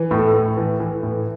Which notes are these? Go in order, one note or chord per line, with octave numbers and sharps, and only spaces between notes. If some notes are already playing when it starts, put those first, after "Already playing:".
Already playing: E3
A2
A4
A2
E3
E3
A2